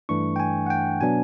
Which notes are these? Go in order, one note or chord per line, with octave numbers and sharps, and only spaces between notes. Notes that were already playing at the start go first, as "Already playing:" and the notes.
G2 E3 A3 D4 C#6
G5
G#5
F#5
G5
B2 F#3 B3 D4 G#5